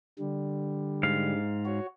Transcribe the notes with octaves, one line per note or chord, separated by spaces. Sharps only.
D3 G3
G#2 F5
F#4 C#5